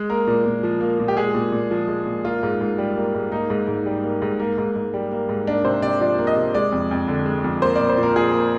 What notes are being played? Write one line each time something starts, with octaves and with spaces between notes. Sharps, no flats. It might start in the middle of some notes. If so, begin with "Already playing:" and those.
Already playing: G#3
A#3 A#4
A#2
A#2
F3
A#3
A#2
G4
G#3 G#4
A#2
A#2
F3
G#3
A#2
A#3 F4
G#2
G#2
G3
A#3
G#2
A#3 D#4
G#2
G#2
G3
A#3
G#2
A#3
G#2
G#2
G3
A#3
G#2
A#3 D4
C3 C5
C3 D5
F3 D5
A#3
D#5
C3
G#3 D5
F2
F2
D3
G#3
F2
A#3 C5
D5
A#2
C5
A#2
A#4
F3 G#4
A#3